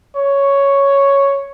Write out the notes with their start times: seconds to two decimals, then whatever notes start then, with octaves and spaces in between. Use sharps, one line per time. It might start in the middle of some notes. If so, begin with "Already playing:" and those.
0.17 C#5